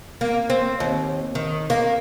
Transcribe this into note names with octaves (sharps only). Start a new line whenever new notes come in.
A#3
C4
D#2
D#3
A#3